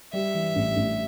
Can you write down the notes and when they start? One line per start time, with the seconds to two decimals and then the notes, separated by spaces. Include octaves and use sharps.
0.13 G3 E5
0.34 E3
0.56 A1
0.76 A1